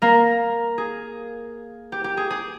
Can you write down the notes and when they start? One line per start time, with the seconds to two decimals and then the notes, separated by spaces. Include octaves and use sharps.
0.02 A#3 A#4
0.78 G#4
1.92 G4
2.04 G4
2.17 G#4
2.30 G#4